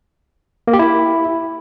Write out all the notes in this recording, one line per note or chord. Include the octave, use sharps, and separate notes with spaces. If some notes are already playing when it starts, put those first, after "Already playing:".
A#3
G4
E4